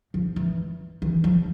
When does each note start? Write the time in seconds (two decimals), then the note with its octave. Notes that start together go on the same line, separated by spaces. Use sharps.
0.14 F3
0.36 E3
1.02 E3
1.24 F3